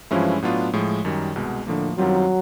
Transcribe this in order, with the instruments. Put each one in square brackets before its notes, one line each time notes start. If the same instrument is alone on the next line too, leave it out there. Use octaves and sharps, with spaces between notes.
[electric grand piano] G2 E3 G#3 C#4 E4 [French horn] F3
[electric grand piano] A2 F#3 B3 D4 F4
A2 F3 G#3
F#2 D#3 G3
C2 B2 G#3
[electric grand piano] A2 F3 A#3 [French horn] D3
[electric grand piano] F#2 D#3 G3 C4 F4 [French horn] F#3